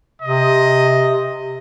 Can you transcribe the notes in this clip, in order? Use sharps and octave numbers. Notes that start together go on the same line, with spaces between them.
C3 D#5